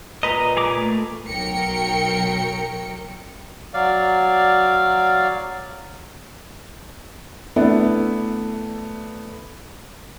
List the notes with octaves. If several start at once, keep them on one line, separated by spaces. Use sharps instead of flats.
A#2 B4 D#5 A#5
G#4 A#5 D6
A3
B1 F#3 A#4 G5 C#7
F#3 D5 F5
A3 B3 D4 E4